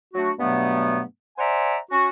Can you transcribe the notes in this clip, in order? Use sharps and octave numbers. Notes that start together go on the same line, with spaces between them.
F#3 A3 D4 F#4
G2 B2 F#3 A3 B3
C5 D5 E5 F#5 G#5 A#5
C#4 F#4